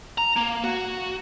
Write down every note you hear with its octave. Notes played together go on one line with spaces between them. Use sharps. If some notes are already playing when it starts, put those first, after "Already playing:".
A#5
A#3
F#4